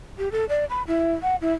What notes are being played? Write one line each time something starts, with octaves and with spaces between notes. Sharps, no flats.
G4
A4
D5
B5
E4
F#5
E4